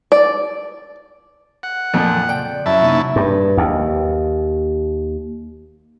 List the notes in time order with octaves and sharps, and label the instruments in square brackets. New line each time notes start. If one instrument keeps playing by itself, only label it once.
[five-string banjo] D5
[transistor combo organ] F#5
[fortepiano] F2 A#2 F3
[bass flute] C#3 [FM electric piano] D5 [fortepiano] G5
[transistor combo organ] F#2 E4 A5 [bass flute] E5
[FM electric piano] C3 A#3 D#4
[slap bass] G2
D#2